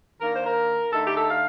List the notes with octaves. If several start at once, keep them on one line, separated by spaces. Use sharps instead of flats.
D#3 A#3 D4 A#4
C5
A#4
D3 A3 D#4 A4
G4
A4
F5